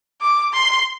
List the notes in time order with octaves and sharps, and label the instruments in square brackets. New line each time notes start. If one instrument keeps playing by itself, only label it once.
[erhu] D6
C6